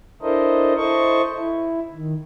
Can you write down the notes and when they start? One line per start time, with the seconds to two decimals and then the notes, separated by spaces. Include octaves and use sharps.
0.22 D4 E4 A4 A#4 C5 D#5
0.77 E4 A4 C5 D#5 C#6
1.35 E4
1.94 D#3